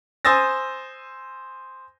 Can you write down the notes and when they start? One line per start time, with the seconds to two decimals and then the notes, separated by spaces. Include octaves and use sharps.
0.25 C5 G#5 D#6 E6 A6 A#6